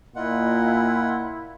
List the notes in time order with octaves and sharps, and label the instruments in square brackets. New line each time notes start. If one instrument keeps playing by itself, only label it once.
[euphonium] A#2 [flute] E4 [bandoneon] F4 F#5 [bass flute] D#5